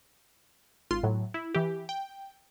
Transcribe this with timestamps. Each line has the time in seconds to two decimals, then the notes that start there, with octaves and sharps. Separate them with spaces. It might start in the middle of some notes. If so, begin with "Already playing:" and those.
0.91 G#1 F4 C6
1.03 A2 F#3
1.34 E4
1.54 E3 G4
1.89 G5